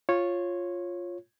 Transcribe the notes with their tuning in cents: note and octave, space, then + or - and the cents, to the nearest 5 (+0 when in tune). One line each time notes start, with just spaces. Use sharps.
F4 +0 C#5 -15